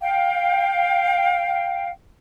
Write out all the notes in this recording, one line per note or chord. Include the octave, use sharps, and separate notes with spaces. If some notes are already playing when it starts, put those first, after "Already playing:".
F5 G5